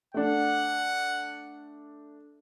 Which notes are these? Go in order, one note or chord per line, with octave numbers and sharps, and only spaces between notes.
A3 D4 F#5